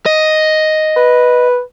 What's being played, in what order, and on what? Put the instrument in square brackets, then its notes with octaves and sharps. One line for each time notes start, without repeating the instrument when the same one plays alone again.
[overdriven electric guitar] D#5
[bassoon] B4